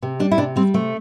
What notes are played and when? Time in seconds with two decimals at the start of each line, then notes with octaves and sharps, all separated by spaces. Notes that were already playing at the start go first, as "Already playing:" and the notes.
0.03 C3
0.20 G3 D4
0.31 E4
0.38 C3 D4
0.56 G3 C4
0.74 C3 A3